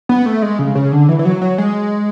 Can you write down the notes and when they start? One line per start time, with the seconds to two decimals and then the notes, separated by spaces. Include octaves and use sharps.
0.09 B3
0.26 A3
0.42 G#3
0.59 C#3
0.75 C#3
0.92 D3
1.09 E3
1.19 E3
1.25 F#3
1.42 F#3
1.58 G#3